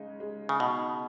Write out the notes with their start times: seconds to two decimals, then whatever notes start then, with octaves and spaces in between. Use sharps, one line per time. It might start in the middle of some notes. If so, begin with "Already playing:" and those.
Already playing: C#3 G#3 D#4
0.20 G#3
0.49 C#3
0.60 B2 D#4